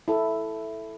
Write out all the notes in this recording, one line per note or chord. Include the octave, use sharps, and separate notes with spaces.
E4 A4